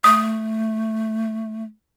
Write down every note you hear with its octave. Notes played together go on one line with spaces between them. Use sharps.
A3 D#6